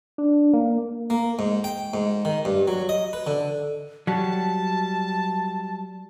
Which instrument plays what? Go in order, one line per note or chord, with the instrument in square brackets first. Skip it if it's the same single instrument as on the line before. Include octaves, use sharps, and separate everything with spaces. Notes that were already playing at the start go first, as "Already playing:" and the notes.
[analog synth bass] D4
A#3
[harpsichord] A#3
G#2
G5
G#2
D#3
G2
F#3
D#5
B4
D3
[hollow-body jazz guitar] F#3 G3 [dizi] A5